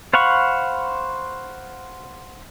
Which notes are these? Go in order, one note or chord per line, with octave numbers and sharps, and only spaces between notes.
C5 F5 F#5 B5 C#6